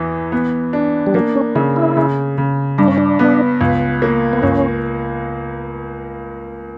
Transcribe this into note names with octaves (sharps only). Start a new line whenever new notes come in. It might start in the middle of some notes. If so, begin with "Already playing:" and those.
Already playing: E2 E3
B3
D4
G3
F#3 A#3
C#4
C#3 E4
E4
C#3
C#3
G2 D4
C#4
D4
B3
C#2
A#3
B3
C#2 C#4